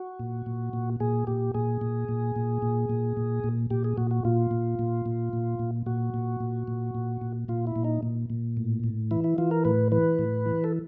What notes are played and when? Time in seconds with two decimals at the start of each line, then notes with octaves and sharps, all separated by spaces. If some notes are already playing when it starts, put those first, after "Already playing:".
Already playing: F#4
0.19 A#2
0.46 A#2
0.73 A#2
1.00 A#2 G#4
1.27 A#2 G4
1.54 A#2 G#4
1.81 A#2
2.09 A#2
2.36 A#2
2.62 A#2
2.89 A#2
3.17 A#2
3.44 A#2
3.70 A#2 G4
3.84 G#4
3.98 A#2 F#4
4.11 F#4
4.25 A#2 F4
4.51 A#2
4.79 A#2
5.06 A#2
5.33 A#2
5.59 A#2
5.86 A#2 F#4
6.14 A#2
6.40 A#2
6.68 A#2
6.95 A#2
7.21 A#2
7.48 A#2 F4
7.67 E4
7.76 A#2
7.84 D#4
8.03 A#2
8.30 A#2
8.57 A2
8.84 A2
9.11 E3 E4
9.24 E4
9.38 E3 F4
9.51 A#4
9.65 A2 B4
9.92 E3 B4
10.19 A2
10.46 E3
10.64 A4